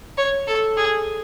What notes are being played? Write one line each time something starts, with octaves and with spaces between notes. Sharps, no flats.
C#5
A4
G#4